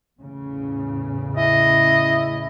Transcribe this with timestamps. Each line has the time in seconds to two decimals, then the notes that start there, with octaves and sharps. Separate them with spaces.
0.20 E2 A2 C#3
1.37 E4 D#5